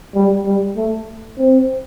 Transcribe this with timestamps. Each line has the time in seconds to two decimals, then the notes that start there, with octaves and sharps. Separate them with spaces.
0.15 G3
0.46 G3
0.77 A3
1.38 C4